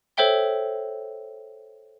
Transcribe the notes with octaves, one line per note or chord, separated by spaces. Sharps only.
A4 C5 C#5 E5 G5 G7